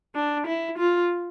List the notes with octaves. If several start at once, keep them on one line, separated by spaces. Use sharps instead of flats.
D4
E4
F4